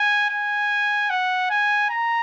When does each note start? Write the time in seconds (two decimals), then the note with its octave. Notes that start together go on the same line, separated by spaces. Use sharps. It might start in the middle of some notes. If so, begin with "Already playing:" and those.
Already playing: G#5
0.30 G#5
1.10 F#5
1.50 G#5
1.90 A#5